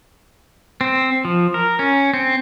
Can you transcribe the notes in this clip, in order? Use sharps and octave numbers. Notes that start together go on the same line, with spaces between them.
C4
F3
A#4
C#4
C4